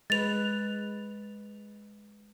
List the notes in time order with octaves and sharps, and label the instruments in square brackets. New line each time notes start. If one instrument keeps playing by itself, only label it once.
[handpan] G#3 B4 [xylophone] A6 F7